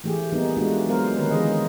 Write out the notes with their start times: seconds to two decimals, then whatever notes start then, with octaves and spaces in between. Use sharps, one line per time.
0.04 E3 A3 G4 G#4
0.32 G3 A#3 B3 D#4
0.57 G#3 A3 D4 F4 F#4
0.87 F#3 G#3 B3 A#4 C5 F5
1.17 D3 D#3 A#3 C#4 A#4 B4
1.30 E3 G#3 B3 G#4 C5 D#5